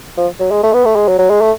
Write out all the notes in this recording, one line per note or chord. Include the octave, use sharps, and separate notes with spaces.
F3
F#3
G#3
A3
B3
A3
G#3
F#3
F#3
G#3
A3